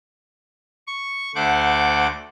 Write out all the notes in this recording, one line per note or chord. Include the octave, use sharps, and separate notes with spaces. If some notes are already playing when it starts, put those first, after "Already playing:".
C#6
D2 A3 C5 F#5 D6